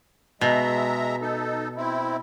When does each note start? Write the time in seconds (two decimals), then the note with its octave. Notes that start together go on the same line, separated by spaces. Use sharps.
0.41 B2 G#3 E5 A#5
1.21 D#4 A4
1.77 C4 E4